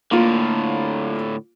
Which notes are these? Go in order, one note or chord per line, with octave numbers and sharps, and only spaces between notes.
A2 D3 A#3 F4